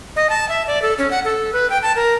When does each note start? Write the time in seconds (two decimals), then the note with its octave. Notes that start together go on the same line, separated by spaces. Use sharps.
0.16 D#5
0.30 A5
0.49 E5
0.67 D5
0.82 A4
0.98 C#4
1.11 F#5
1.25 A4
1.53 B4
1.70 G5
1.83 A5
1.96 A#4